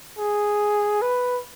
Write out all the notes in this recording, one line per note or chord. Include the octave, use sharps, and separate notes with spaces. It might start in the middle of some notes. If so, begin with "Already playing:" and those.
G#4
B4